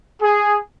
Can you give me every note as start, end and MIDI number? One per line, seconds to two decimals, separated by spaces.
0.22 0.57 68